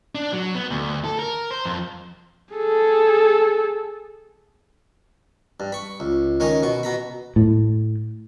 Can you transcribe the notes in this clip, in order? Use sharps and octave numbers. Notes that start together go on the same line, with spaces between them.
D4
F#3
B3
D2
A4
A#4
C5
F2
G#4 A4
G2
B5 C#6
C#2
D#3 C#4 C#5 D#5
B2 C#6
B2 A#5 B5
A2